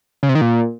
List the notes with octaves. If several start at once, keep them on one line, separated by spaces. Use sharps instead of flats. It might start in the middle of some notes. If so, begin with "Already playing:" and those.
C#3
C3
D#3
A#2